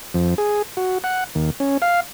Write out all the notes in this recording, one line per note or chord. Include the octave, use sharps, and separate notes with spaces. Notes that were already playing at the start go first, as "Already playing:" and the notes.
F2
G#4
F#4
F#5
D#2
C#4
F5